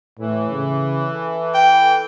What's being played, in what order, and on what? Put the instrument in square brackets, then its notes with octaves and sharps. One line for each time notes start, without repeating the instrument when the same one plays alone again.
[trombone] A2 [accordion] E3
[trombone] C#3
A4
[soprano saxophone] G5